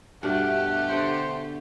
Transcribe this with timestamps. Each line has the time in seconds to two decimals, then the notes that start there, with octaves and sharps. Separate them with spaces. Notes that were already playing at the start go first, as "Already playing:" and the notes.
0.23 G2 B2 A3 G4 D5 F#5
0.88 D3 C5 F#5 G5